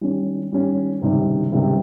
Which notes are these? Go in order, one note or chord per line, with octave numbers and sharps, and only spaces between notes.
D#3 G3 C#4
D#3 G3 C#4
C#2 C3 D#3 G3
C#2 C3 D#3 G3